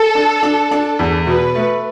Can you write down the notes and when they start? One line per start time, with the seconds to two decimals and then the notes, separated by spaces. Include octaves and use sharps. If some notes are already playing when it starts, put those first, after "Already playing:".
Already playing: A4
0.15 D4
0.43 D4
0.71 D4
0.99 E2
1.27 B2 B4
1.55 A3